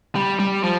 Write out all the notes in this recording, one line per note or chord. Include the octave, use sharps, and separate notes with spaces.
G3
G3
F3